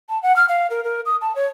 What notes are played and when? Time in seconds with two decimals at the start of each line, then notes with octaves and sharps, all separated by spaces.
0.09 A5
0.23 F#5
0.36 F6
0.49 F5
0.70 A#4
0.84 A#4
1.06 D#6
1.21 A5
1.36 C#5